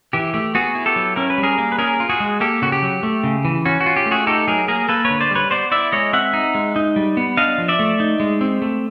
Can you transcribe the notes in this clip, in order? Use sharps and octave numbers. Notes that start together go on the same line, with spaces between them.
E3 G4
A3 G4
B3 F#4 G#4
E4
G4 A4
F#3
C#4 A#4
B4
G3
G#4 A#4
A#3
B4
C#4 G#4 A#4
F4
F#4 G#4
G#3
A#3 G4 A4
C#3 F#4
G4
F#3
A3
C#3
E3
C#4 F#4
F#4
F4
G4
A3
F#4 G#4
D#4 G4 A4
F#3 G#4 A#4
A#3 G#4 A#4
A#3 A4 B4
B4 C#5
D3
C5 D5
G3 B4 C#5
B3 C5 D5
E4 D5 E5
G#3 C#5 D#5
C4 E5 F#5
D#4
G#3
D#4
G3
B3
D4 D#5 F5
F3
D5 E5
A3
D#4
G#3
C4
A3